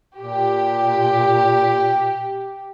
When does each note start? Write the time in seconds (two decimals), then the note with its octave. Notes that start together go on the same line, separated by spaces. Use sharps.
0.16 A#2 G4